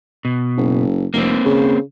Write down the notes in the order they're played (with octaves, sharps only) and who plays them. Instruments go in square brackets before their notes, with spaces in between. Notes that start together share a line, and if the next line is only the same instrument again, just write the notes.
[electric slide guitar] B2
[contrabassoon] F#1
[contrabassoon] F1 [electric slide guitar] A#3 C4
[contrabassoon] C#3